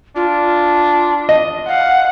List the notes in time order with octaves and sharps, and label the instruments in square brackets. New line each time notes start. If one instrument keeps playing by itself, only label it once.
[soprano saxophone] D4 [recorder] F4
[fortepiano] D#5
[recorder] F5 [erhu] F#5